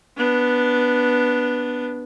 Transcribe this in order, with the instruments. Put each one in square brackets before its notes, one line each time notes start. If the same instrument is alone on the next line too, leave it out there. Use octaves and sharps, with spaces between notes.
[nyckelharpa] B3 D4